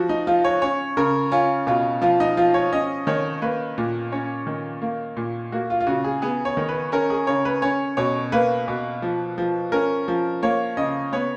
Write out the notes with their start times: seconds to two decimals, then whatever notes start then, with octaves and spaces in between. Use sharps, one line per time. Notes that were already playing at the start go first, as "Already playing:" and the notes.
Already playing: F3 F#4
0.09 D#4
0.27 F3 F4
0.44 C#5
0.62 C#4 C#5
0.97 C#3 A#4
1.32 C#4 F4
1.67 B2 F4
2.02 F3 F4
2.20 D#4
2.37 F3 F4
2.54 C#5
2.72 C#4 D#5
3.07 D#3 C#5
3.42 A#3 B4
3.78 A#2
4.12 C#4 C#5
4.47 D#3
4.82 A#3
5.17 A#2
5.52 A#3 F#4
5.70 F4
5.80 F4
5.87 C#3 F#4
6.04 G#4
6.22 B3 G#4
6.45 C#5
6.57 D#3
6.69 B4
6.92 C#4 A#4
7.10 G#4
7.27 C#3 C#5
7.45 B4
7.62 C#4 C#5
7.97 B2 C#5
8.32 A#3 B4
8.68 B2
9.02 F3
9.38 F3
9.72 C#4 A#4
10.08 F3
10.43 A#3 C#5
10.77 C#3 D#5
11.12 B3 C#5